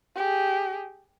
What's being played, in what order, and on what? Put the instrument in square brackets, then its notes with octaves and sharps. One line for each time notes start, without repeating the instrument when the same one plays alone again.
[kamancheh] G4 G#4